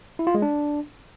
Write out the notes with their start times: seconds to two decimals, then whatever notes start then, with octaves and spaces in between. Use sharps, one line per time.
0.19 E4
0.27 F4
0.35 G#3
0.42 D4